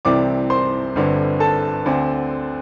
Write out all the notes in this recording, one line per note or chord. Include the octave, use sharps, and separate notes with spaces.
C2 C3 E3 C4 D5 D6
C5 C6
G1 G2 D3 C4
A4 A5
D2 D3 C4